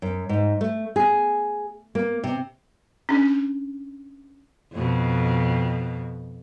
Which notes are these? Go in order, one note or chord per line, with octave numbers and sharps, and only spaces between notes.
F#2
G#2
A3
G#4
A#3
C3
C#4 D4
F2 B2